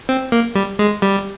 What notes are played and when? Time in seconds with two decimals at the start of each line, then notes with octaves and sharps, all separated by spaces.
0.09 C4
0.32 A#3
0.55 G3
0.79 G#3
1.02 G3